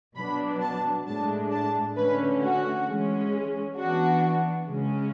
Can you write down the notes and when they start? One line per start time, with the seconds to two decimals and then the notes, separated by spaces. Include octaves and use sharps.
0.16 B2 F#3 B3 D4 B5
0.61 A5
1.06 A2 G#3 D4 A5
1.51 A5
1.97 D3 A3 C#4 B4
2.42 F#4
2.87 E3 G#3 C#4
3.77 E3 B3 D4 F#4
4.67 C#3 G#3 C#4